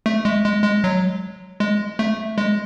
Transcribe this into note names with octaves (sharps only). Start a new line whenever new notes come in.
A3
G#3
G#3
G#3
F#3
G#3
A3
G#3